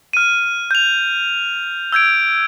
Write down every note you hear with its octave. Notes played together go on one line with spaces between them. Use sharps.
F6 D#7
G6 F7
E6 G6 G#6 D7